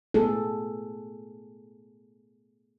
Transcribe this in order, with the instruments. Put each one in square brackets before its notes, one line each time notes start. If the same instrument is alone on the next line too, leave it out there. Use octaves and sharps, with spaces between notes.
[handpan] A3 B3 G#4 A4